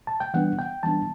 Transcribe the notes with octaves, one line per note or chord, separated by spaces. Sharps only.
A5
G5
E3 G3 B3 D4 F#5
G5
E3 G3 B3 D4 A5